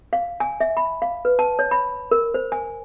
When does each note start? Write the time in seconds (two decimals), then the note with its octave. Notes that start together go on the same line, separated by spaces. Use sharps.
0.13 F5
0.40 G#5
0.60 E5
0.77 B5
1.02 F5
1.25 B4
1.39 A5
1.59 C#5
1.71 B5
2.11 A#4
2.34 C5
2.52 G#5